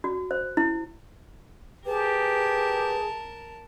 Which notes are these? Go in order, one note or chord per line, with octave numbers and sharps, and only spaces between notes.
F#4
C5
E4
G4 G#4 A#4 B4 A5